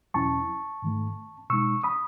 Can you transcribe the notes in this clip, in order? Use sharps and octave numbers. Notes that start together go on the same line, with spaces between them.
E2 B2 F#3 C#4 E4 A5 C#6
G#2 D#3 A3
B2 G#3 D#4 C#6 E6
B5 D#6